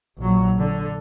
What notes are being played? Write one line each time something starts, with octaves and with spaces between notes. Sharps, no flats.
A#1 F#3
D3